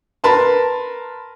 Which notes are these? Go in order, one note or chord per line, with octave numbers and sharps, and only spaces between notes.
A#4 B4 A5 C6